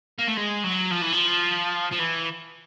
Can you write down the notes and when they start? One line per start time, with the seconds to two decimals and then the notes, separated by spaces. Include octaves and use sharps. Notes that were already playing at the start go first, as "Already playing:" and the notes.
0.19 A#3
0.27 A3
0.37 G#3
0.64 F#3
0.91 F3
1.02 E3
1.13 F3
1.92 F3
2.00 E3